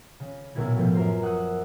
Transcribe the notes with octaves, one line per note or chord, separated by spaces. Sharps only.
C#3 C#4
B1 A#2 C#3 E4 G#6
A2 F3 B3 F4 G6
F#2 A#4 C5
F#5 D#6 E6 F#6